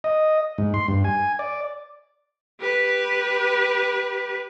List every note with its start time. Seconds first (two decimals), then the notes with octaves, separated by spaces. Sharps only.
0.04 D#5
0.58 G#2
0.74 C6
0.88 G2
1.04 G#5
1.39 D5
2.61 G4 B4